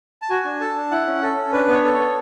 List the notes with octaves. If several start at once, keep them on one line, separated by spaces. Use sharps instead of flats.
A5
F#4 G#5
D4
A4 A5
D4
E4 F#5
C#4
A4
C#4
D4 B4
B3
C#5
A4
C#5
B3